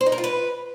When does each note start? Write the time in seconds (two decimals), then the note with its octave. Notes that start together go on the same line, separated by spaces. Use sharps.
0.01 C5
0.06 D#4
0.12 A#4
0.18 F4
0.24 B4